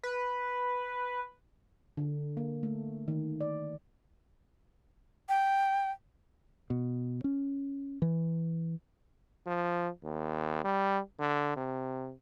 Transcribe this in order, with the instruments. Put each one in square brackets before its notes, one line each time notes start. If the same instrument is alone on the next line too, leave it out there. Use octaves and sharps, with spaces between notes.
[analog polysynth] B4
[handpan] D3
A#3
A3
D#3
D5
[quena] G5
[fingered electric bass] B2
C#4
E3
[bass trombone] F3
D#2
G3
D3
C3